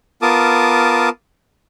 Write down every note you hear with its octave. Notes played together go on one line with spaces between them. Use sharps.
B3 F4 A#4 A5 D6 D#6